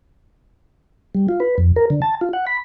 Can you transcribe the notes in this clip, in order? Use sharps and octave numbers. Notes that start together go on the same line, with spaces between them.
G3
F4
B4
F2
A#4
D3
A5
F4
F#5
B5